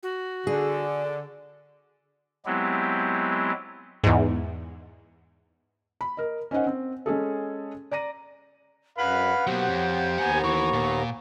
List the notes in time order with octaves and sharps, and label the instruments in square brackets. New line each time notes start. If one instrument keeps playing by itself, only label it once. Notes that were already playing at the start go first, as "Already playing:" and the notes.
[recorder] F#4
[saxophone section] D3 [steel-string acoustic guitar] G#4 [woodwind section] D5
[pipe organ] F#3 G#3 B3 C4 E4 G4
[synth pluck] E2 G#2
[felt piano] B5
A#4 D#5
C#4 D#4 C5 D#5 F#5
C4
G#3 C#4 G#4 A4
D5 A#5 A#6 D#7
[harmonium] F#2 [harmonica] B4 F5 B5 [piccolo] F#5
[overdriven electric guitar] B2 F#3 [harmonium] A#3 B3 [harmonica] G4 C5
[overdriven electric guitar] F2 [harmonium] C#5
[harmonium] D#2 B3 A#5 [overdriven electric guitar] A#3 F#5 [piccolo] G#5
[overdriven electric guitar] E3 [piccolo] C#6
[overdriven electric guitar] A#2